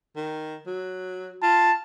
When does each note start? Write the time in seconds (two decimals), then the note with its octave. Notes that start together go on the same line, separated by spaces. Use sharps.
0.16 D#3
0.66 F#3
1.43 F4 A5